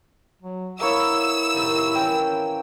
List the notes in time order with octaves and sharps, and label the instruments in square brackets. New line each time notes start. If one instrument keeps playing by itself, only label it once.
[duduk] F#3
[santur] A#3 C#5 [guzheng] B3 [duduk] E4 [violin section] E6
[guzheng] A2 C3 D#3
[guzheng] E3 A#3 C#4 [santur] G5